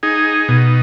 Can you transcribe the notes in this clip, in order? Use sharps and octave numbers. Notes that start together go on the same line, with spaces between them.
D#4 G#4
B2